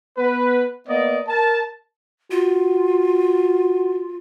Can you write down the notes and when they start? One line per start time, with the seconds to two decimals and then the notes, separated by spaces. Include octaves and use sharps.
0.18 B3 B4
0.88 A#3 B3 D5 D#5
1.28 A#4 A5
2.31 F4 F#4